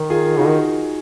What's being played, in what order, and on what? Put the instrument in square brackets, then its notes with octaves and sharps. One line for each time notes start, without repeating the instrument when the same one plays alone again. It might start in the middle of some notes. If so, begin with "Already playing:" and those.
Already playing: [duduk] D#3
[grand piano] F4 G#4
[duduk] C#3 [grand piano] D#4 F#4
[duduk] D#3